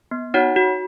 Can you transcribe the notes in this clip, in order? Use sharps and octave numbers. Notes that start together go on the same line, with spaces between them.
B3
D#4 F#4 C#5 F#5
F#4